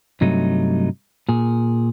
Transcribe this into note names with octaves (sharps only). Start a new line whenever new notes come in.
G2 C3 F#3 A3 D#4
A#2 G#4